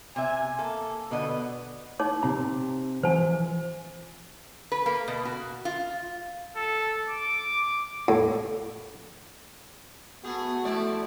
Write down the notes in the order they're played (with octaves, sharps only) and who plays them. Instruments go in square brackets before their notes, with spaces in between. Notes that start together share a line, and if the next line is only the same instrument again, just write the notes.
[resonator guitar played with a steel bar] C3 E5 [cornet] G#5
[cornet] A#3 [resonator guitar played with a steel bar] A4
[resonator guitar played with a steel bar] B2 D3 D#5 [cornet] B3
[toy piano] D#4 C#5 D6
[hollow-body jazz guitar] C3 C4 A#5
[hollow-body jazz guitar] E3 F3 [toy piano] C5 G#5
[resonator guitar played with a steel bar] B4
A#3
B2
F#4
F4
[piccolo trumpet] A4
D6
[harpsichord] A2
[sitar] A3 G#4 [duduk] B3 [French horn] F#4
[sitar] F3 E4 D5 [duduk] A3